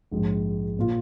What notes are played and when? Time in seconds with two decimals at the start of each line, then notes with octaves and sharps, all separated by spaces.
0.11 A#1 G#2 G#3
0.79 A#2 A#3 F4